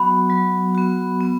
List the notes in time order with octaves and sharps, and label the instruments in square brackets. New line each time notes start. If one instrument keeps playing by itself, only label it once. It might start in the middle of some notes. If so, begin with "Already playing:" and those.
Already playing: [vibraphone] F#3 B3 F#4 [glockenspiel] B5
[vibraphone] F#3
B3 F#4
B3